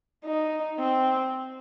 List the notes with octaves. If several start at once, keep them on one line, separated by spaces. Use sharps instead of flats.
D#4
C4